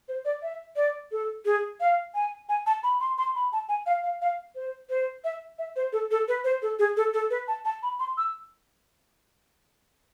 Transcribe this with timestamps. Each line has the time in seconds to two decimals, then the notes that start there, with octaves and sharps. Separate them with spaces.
0.08 C5
0.25 D5
0.42 E5
0.76 D5
1.12 A4
1.45 G#4
1.81 F5
2.15 G#5
2.49 G#5
2.66 A5
2.83 B5
3.00 C6
3.18 C6
3.36 B5
3.53 A5
3.69 G#5
3.86 F5
4.03 F5
4.22 F5
4.55 C5
4.90 C5
5.24 E5
5.59 E5
5.76 C5
5.93 A4
6.11 A4
6.28 B4
6.44 C5
6.62 A4
6.79 G#4
6.97 A4
7.14 A4
7.30 B4
7.48 A5
7.65 A5
7.83 B5
8.00 C6
8.18 E6